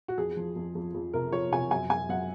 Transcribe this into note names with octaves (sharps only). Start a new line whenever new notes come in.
F#4
F2 G#4
F3
F2
F2
F2
C3 A#4
F3 C#5
C3 G#5
F#2 G#5
F#2 G#5
F#2 F#5